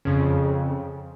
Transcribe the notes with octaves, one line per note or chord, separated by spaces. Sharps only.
F2 C#3